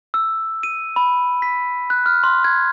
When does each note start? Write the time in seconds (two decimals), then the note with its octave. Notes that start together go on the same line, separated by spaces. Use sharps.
0.14 E6
0.63 D#7
0.96 B5
1.42 B6
1.90 F#6
2.06 F6
2.24 C6
2.44 G#6